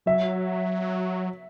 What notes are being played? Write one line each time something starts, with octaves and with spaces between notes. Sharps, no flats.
F#3 E5